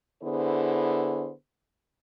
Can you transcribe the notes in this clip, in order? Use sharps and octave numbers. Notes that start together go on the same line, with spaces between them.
D3 B3 E4 G#4 C5